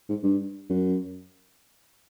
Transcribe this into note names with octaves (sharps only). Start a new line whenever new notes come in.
G#2
G2
F#2